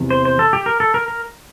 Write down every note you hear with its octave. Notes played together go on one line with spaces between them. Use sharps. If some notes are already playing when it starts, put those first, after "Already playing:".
Already playing: E2 C3 E3
C5
C5
A4
G4
A#4
A4
A#4
A#4